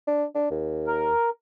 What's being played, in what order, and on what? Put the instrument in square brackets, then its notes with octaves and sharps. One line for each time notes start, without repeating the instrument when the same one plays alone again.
[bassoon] D4
D4
D#2
[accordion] A#4